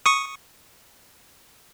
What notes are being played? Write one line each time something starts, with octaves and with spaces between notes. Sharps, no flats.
C#6 D#6